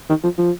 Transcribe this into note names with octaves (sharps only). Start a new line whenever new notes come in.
D#3
F3
F3